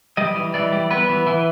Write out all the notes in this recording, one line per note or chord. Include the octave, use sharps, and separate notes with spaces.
G3 D#5
E3
E3 D5
G3
B3 B4
E3
E3